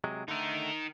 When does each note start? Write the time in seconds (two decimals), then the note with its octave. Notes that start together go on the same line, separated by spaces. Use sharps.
0.04 C3 F#3 G#3
0.28 D3 A3 D#4 A#4